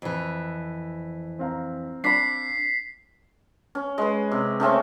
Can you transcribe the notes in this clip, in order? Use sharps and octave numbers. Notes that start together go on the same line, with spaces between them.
F2 E3
C4 F5 A#5
D4 B5 B6 C7
C#4
G#3 B4
C3
C#3 A3 C4 C#4